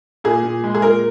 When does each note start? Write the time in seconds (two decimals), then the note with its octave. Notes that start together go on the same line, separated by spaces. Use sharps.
0.24 A#2 G#4
0.43 A#2
0.64 G#3
0.75 G#4
0.82 A#2 A#4